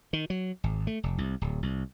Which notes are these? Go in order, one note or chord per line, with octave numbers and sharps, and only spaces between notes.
D#3
F#3
G#1
A3
F1
C2
D1
C2